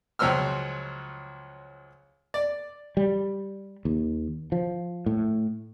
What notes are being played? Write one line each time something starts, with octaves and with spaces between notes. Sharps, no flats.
C#2 F3 F#3 C5 E6 F6
D5
G3
D#2
F3
A2